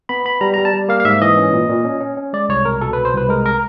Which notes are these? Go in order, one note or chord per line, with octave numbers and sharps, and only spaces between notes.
B3 B5
B3 B5
G3 A#5
A#5
G3
A5
G3
A#3 F5
F5
G#2 E5
E3 D#5
C#4
A#2
A#2
C#4
C#4
C#4
G#3 D5
C2 C#5
B2 A#4
B2 A4
B4
C2
C5
C2 B4
G#3 A#4
A#4